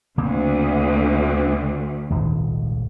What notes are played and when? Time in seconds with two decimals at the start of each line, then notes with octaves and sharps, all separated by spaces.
0.18 D2 C#3 A#3 C4
2.10 D#1 G#1 C#2